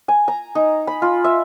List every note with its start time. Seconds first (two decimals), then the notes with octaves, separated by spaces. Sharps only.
0.08 G#5
0.28 A#5
0.55 D#4
0.87 B5
1.02 F4
1.24 E5